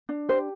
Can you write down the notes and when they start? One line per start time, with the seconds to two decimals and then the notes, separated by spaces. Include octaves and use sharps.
0.09 D4
0.29 G4 C5